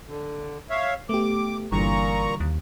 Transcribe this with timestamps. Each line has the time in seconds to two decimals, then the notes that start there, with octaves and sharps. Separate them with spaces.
0.08 D3
0.70 C#5 E5 F5
1.09 A3 B3 G4 D6
1.72 G1 A#2 D3 E3 G3 A#5 C#6
2.40 D#2